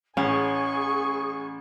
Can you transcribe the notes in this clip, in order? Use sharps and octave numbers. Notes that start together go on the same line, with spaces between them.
A1 C#4 G#4 G#5 C#6